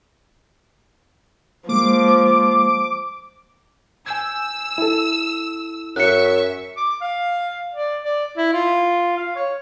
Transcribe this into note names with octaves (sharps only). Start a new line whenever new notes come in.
F3 G#3 A#3 D6
G#5 E6 G6 G#6
E4 A4
F#2 E5 C#6 F#6 C#7
D6
F5
D5
D5
E4
F4
F5
C#5